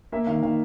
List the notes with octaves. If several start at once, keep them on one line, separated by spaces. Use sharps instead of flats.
A#3 E5
D#3 F5
D#3 F5